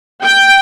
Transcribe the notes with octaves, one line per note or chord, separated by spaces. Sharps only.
G5